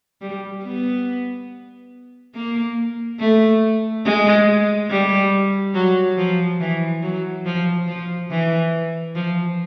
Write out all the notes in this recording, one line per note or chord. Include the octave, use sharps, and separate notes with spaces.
G3
B3
A#3
A3
G#3
G3
F#3
F3
E3
F#3
F3
F3
E3
F3